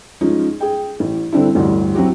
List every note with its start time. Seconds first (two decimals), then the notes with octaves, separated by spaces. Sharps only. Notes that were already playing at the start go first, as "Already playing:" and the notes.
0.21 F3 G#3 C#4 D#4 G#4
0.60 G#4 G5
1.00 A1
1.33 D3 G3 C4 D4 E4
1.55 A1 D2 G2
1.95 F#3 C4 E4 F#4 G4